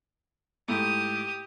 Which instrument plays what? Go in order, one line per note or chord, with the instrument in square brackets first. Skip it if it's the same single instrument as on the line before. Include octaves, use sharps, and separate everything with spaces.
[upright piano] G#2 A3 E4 [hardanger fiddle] G4 D#6